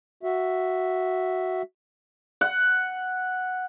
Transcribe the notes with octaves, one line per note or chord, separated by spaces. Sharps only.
F#4 E5
F#5